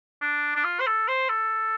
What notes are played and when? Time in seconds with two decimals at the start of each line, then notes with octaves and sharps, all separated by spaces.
0.21 D4
0.56 D4
0.64 F4
0.80 C5
0.87 A4
1.08 C5
1.29 A4